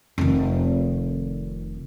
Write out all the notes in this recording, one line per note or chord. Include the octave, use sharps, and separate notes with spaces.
F1 D#3